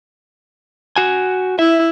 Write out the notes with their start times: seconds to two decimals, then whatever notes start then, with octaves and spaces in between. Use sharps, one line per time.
0.96 F#4 G#5
1.59 E4 E5